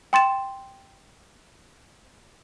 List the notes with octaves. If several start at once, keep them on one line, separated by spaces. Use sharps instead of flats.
G5 C6 A6 E7